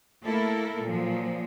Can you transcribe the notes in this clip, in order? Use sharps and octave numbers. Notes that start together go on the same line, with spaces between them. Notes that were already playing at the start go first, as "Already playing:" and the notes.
A3 A#3 E4 A4 A#4
A#2 F3 F#3